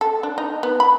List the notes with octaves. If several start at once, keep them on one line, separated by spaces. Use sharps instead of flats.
A4
D4
D#4
B3
B5